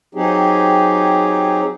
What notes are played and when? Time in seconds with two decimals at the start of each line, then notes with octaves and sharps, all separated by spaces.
0.15 F#3 C4 D#4 G4 G#4